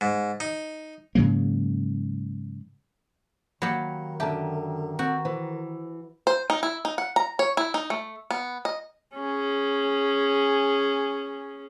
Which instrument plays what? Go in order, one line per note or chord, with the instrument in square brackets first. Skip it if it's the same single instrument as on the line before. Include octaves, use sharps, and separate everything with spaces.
[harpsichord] G#2
D#4
[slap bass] G#2 C#3 F#3 A#3
[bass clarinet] D#3 [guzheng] F#3 G4 [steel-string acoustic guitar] A#3 [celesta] B5 C#7
[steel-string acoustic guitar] F#2 D3 [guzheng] G4 [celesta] E5 A5 A#5
[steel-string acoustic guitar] C4 [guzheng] F#4
[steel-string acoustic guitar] E3 [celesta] C5
[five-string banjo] C5
D#4
E4
D#4
F#5
A#5
C#5
E4
D#4
A3
B3
D#5
[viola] C#4 G#4